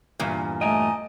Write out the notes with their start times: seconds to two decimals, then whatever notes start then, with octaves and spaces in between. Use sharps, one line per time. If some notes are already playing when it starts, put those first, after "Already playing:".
0.19 E2 G2 A#2
0.62 A3 D#5 G5 G#5 A#5